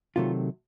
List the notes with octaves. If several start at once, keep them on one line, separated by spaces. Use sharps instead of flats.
C3 D#3 F#3 A3 F4